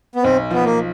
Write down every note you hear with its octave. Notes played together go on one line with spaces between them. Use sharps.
B3
B1 C4
F3 B3
A#3